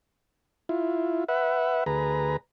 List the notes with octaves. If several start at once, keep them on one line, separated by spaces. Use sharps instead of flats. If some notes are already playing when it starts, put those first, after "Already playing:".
E4 F4
B4 E5 F#5
D2 G#4 B4 A#5